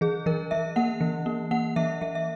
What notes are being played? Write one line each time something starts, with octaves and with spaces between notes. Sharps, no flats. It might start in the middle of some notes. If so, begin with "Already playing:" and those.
E3 G#4
E3 A#4
E3 E5
A#3 F#5
E3
A#3
A#3 F#5
E3 E5
E3 E5
E5